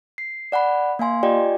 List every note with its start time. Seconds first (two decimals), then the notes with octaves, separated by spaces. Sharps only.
0.18 C7
0.52 D5 F#5 G#5 B5
0.99 A#3 F5 G#5 C6
1.23 F4 G4 D5 D#5 G5 G#5